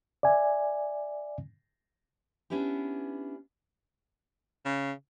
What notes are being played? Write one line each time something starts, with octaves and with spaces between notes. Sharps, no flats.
D5 E5 G#5
B3 C#4 D4 E4 G4
C#3